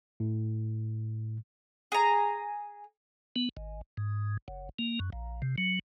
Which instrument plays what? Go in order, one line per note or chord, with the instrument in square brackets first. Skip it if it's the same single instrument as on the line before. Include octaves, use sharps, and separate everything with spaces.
[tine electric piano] A2
[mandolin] G#4 A#5
[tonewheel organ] B3
G#1
G#2
F#1
A#3
F#2
A#1
C3
F#3